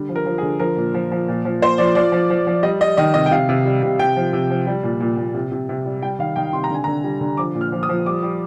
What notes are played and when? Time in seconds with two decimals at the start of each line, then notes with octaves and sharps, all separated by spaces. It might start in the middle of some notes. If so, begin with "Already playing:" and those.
Already playing: D3 G3
0.09 F3
0.16 A#4
0.26 F3
0.38 G#4
0.43 D3
0.60 F3 A#4
0.77 A#2
0.94 F3
1.12 F3
1.28 A#2
1.45 F3
1.61 A#2 C5
1.78 F3 D5
1.95 F3 D5
2.12 F3
2.30 F3
2.47 F3
2.63 G3 D#5
2.81 G3 D#5
2.97 D#3 D#5
3.14 C3 D#5
3.26 G5
3.31 C3 F5
3.49 C3
3.65 G3
3.83 C3
3.99 C3 G5
4.16 F3
4.33 C3
4.50 F3
4.67 G3
4.83 A#2
5.00 A#2
5.17 A#2
5.34 C3
5.52 C3
5.69 C3
5.86 G3
6.03 G3 G5
6.19 D#3 F5
6.36 D#3 G5
6.53 C3 C6
6.64 A#5
6.70 D3 G#5
6.84 D3 A#5
7.04 G3
7.21 D3
7.37 F3 D6
7.55 A#2
7.61 F6
7.72 F3
7.83 D#6
7.89 F3
8.06 G3 D6
8.23 G3